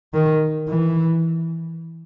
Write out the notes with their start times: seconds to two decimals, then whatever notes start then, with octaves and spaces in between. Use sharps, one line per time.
0.13 D#3
0.68 E3